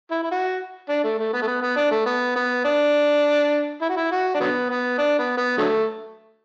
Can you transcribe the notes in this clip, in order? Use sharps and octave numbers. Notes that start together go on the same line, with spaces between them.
E4
E4
F#4
D4
A3
A3
B3
A3
B3
B3
D4
A3
B3
B3
D4
E4
F#4
E4
F#4
D4
D3 F#3 B3
B3
D4
B3
B3
D3 F#3 A3